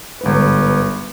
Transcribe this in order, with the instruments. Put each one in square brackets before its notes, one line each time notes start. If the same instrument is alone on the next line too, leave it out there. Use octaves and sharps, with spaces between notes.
[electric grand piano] G1 G#2 B4